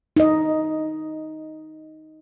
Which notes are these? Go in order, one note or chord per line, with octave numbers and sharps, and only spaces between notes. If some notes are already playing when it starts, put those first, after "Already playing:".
D#4 D#5